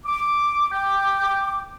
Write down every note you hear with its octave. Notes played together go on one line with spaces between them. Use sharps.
D6
G5 D6